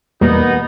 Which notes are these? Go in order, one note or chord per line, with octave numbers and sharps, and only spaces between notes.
E2 B2 G3 A#3 B3 D#4